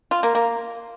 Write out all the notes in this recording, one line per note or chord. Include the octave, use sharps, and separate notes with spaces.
F4
A#3
A#3